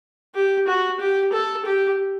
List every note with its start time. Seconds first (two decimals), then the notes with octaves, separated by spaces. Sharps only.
0.35 G4
0.67 F#4
1.00 G4
1.32 A4
1.65 G4